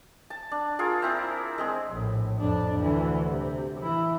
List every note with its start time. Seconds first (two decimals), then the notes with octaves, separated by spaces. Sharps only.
0.30 A5
0.51 D4
0.79 F4 G#4 A#4
1.02 C4 E4 A#4
1.58 G#3 C4 G#4
1.89 A#1 A2
2.38 F2 D4
2.78 D2 E3
3.30 C3
3.79 E3 E4